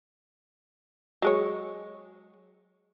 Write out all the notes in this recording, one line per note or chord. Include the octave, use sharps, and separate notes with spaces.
F#3 G#3 C#5